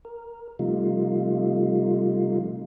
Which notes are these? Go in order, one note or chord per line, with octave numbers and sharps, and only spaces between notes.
A#4
C3 F3 G3 A3 D#4 F4